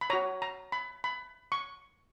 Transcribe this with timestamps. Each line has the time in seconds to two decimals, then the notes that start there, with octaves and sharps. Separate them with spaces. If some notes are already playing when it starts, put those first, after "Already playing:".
0.01 B5
0.10 F#4 C#5 A#5
0.42 A#5
0.72 B5
1.04 B5
1.52 C#6